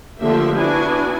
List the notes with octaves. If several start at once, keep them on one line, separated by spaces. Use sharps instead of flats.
D3 F3 A3 A#3 G4 E5
B3 D4 E4 F#4 G#5